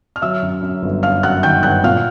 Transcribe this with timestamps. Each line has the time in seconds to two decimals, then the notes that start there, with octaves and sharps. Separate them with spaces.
0.16 F6
0.22 F#3 E5 E6
0.42 F#2
0.62 F#2
0.83 G1
1.03 F#2 F5 F6
1.23 F#2 F#5 F#6
1.43 D#3 G5 G6
1.63 G1 F#5 F#6
1.83 A#2 F5 F6